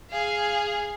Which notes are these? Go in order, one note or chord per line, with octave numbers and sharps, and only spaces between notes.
G#4 F5